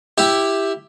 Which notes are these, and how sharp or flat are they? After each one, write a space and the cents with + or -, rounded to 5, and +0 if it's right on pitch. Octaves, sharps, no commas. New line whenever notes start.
E4 +0 G4 +5 E5 +0